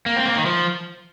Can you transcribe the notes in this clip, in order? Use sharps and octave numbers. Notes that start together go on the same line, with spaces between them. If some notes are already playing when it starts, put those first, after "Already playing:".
A#3
C4
A#3
D#3
F3